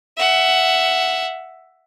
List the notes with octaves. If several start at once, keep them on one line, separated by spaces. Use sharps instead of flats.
E5 F#5